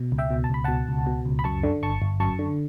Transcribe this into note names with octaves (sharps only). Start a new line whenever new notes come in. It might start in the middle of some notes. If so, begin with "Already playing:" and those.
Already playing: B2
C#2
E5 G5
B2
A5
C#2 B5
B2 F#5 A5
C#2
B2
C#2
B5
F#2 A5 C#6
D3
G1 A5 C#6
G1
F#2 A5 C#6
D3